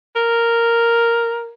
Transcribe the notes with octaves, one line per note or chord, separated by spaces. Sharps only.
A#4